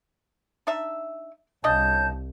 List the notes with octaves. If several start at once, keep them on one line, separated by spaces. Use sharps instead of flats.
D4 D#4 E5
C2 C#3 D4 C#5 D#5 A5 G6